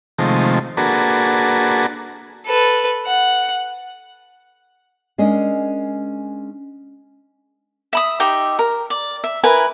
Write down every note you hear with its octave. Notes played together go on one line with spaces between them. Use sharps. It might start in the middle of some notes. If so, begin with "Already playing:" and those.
C3 D#3 F3 G#3 A3
A#3 D4 F#4 G#4 A4 B4
A4 B4
F#5
G#3 C#4 D4 A#4 D#5
E5 B5 D#6
D#4 G4 E5
A#4
D5
E5
E4 A#4 B4 G#5